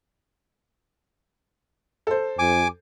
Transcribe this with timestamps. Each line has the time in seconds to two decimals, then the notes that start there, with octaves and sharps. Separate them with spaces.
2.07 A4 C5
2.39 F2 G#5 D6